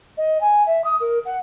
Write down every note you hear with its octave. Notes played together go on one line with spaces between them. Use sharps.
D#5
G#5
E5
D#6
A#4
F#5